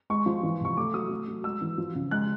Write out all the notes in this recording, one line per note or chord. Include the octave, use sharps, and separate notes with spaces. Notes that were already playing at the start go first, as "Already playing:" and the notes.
G#3 C#6
F3
E3
C3 C#6
A3 D6
F#3 D#6
A3
F#3
G#3 E6
E3
F3
C#3
G#3 F#6